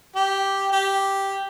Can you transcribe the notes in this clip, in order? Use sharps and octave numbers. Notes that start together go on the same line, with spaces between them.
G4
G4